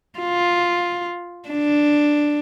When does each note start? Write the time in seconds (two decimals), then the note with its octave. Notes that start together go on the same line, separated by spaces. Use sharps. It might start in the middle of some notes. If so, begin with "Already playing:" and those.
0.19 F4
1.49 D4